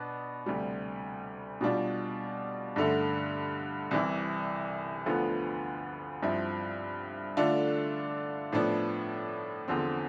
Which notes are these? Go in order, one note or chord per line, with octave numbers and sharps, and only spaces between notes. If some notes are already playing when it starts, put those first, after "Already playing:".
Already playing: B2 B3 D4
D2 C3 G3
B2 G3 D4 F4
G2 D3 A3
C2 C3 E3
D2 D3 F3 B3 F4
G2 F3 C4 E4
D3 A3 D4 F4
A2 F3 B3 D4
E2 D3 F3 C4